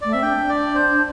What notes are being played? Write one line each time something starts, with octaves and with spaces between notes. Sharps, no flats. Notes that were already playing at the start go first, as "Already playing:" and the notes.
A3 D5
C4 E5
D4 G5
D5
C5